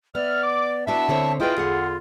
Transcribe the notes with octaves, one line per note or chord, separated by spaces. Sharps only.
B3 D5 E5 F6
D6
B3 D4 E4 F#4 D5 E5 A5
D3 C4 C#5
E4 F4 G#4 B4 D#5 G5
E2 D3 G#4 F#5